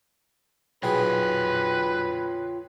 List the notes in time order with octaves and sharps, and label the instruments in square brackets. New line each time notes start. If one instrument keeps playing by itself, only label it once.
[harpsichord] B1 B2 G#4 [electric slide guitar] F4 C#5 G5 [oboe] B4